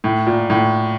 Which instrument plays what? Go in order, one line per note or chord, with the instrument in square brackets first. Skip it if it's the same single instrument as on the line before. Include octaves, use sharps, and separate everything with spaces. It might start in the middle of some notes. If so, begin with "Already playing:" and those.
[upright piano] A2
A#2
A2